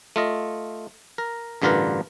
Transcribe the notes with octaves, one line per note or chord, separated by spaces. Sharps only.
A3 F4 D#5
A#4
A1 G2 D3 F4 A#4 B4